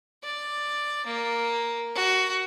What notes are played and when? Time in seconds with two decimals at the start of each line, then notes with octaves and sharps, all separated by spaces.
0.23 D5
1.06 A#3
1.94 F#4